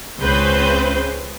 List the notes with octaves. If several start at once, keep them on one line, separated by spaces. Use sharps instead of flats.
C#2 C#3 C4 B4 C5 G6